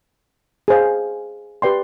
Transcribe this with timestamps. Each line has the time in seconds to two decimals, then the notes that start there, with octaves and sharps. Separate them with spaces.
0.68 G#4 C5 F5
1.62 G4 B4 D5 G5 C6